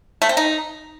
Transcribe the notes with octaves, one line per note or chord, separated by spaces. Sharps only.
A3
C4
D#4